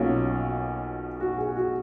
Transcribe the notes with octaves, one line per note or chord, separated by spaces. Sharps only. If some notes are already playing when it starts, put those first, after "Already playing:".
Already playing: B1 B2 A#3 C#4 F4
F#4
G#4
F#4